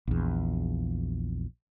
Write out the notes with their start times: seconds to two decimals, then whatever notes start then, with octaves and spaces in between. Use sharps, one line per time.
0.07 A#1 E2